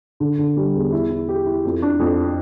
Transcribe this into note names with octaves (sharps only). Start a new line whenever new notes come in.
D3
D3
G3
E2
E4
E4
G4
E4
F2
D4
F2